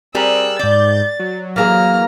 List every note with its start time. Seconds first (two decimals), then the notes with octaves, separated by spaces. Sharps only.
0.15 G3 C4 G#4 A#4 E6 F#6
0.59 G#2 D5 G6 A6
1.20 F#3
1.56 E3 A#3 G#4 A#5 F6